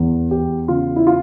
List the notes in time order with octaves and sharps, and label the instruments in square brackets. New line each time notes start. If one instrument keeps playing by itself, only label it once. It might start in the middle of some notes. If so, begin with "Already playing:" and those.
Already playing: [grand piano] E2
E2 G4
C#3 F4
E4
F4